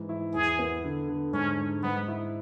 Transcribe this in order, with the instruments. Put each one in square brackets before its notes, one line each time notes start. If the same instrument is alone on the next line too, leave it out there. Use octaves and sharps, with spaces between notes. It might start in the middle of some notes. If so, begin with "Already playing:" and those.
Already playing: [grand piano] G#2 E3
E4
[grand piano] E2 [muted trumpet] G#4
[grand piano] B3
D3
D3
[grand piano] G#2 [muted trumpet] C#4
[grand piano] G#2
[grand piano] G#2 [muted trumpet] B3
[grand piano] E4